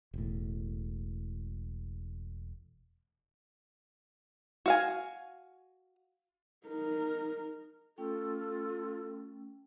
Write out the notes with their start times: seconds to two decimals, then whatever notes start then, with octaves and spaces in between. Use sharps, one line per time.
0.14 E1 A2
4.66 F#4 F5 G#5
6.67 D#4 A#4
7.98 A3 C#4 F4 A4 G5